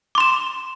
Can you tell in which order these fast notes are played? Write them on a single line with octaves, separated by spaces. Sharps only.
D6 C6 E7